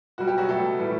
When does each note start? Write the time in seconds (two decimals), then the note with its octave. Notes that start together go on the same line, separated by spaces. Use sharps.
0.18 B2 G3 F#4
0.28 G4
0.38 F#3 F#4
0.49 B2 F#3 A3 A4
0.79 A2 E3 G3